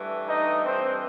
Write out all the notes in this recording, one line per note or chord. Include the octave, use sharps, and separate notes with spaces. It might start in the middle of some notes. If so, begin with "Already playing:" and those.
Already playing: G2 E3 A3
D#4 D#5
C4 C5